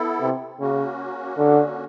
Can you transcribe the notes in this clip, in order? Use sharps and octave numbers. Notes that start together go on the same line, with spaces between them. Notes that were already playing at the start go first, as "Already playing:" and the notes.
Already playing: B3 E4 A4
C3
C#3 A#3 C#4 F#4
D3